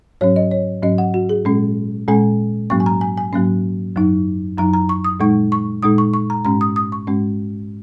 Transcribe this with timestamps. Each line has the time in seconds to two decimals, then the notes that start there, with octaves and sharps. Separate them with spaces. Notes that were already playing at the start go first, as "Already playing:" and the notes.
0.21 G#2 F#3 C#4 C#5
0.36 D#5
0.51 C#5
0.83 G#2 F#3 C#4 D#5
0.98 F#5
1.14 F#4
1.29 G#4
1.45 A#2 G#3 C#4
2.08 A#2 G#3 C#4 G#5
2.70 G#2 F#3 A#3 C#4 C#6
2.80 G#5
2.86 A#5
3.01 G#5
3.18 G#5
3.33 G#2 F#3 A#3 C#4
3.96 F#2 F#3 D#4
4.57 F#2 F#3 D#4 A#5
4.74 A#5
4.89 C#6
5.04 D#6
5.20 A#2 G#3 D#4 C#6
5.52 C#6
5.83 A#2 G#3 D#4 D#6
5.98 C#6
6.14 C#6
6.30 A#5
6.45 G#2 G#3 C#4 A#5
6.61 D#6
6.76 D#6
6.92 C#6
7.07 G#2 G#3 C#4